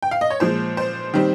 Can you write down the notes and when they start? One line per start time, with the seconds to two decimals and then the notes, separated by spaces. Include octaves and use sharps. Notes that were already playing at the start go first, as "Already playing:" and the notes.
0.02 G5
0.11 F5
0.21 D#5
0.30 C#5
0.40 A#2 F3 G#3 C5
0.77 C5
1.14 D#3 G3 C4